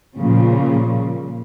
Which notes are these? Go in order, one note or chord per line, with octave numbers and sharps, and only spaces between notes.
A#2 C#3 F3 G3